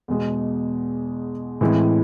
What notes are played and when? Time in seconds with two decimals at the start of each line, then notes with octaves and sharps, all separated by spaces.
0.08 E2 B2 G#3
1.61 A2 E3 G#3 C4 E4